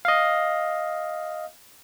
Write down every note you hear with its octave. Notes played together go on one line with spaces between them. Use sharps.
D#5 F5